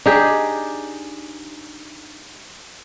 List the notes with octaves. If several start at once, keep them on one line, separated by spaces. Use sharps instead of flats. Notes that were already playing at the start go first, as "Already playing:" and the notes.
D4 D#4 G4 G#4